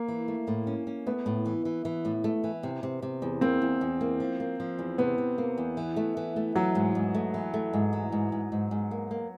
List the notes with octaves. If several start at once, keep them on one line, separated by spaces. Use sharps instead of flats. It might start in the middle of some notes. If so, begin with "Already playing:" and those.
Already playing: A#3
E3
A3
A2
C#4
C#4
A3 B3
A2
E3
E3
E3
A2
A3
E3
C3
C3
C3
E2
A#3 C4
E2
E2
A#3
F3
A#3
F3
E2
C3 B3
C3
A#3
E2
E3
A3
E3
A3
E3 F#3
G#2
G#2
A3
E3
A3
G#2
E3
G#2
G#2
G#2
G#2
A#3
A#3